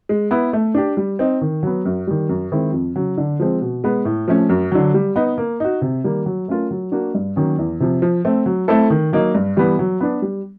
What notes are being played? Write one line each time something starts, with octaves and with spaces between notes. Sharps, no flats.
G#3
B3 E4
A3
D4 G4
G3
C4 D#4
D#3
F#3 B3
F#2
D#3 G3
F#2
D#3 G#3 C4 E4
F2
C#3 F#3
D3
F3 G#3 C4
B2
G#3 B3
A2
F3 A3 C#4
F#2
D3 F#3
G3
B3 D#4
A#3
D#4 F#4
C3
D#3 G3 A#3
F#3
A3 C#4 F4 A#4
F#3
A#3 D4 F#4
G2
D#3 F#3 A#3 C#4
E2
C3 F3
F3
A3 C4
F#3
A3 C4 E4 A4
D#3
F#3 A#3 D#4
G2
E3 G3 B3
F#3
B3 D4
G3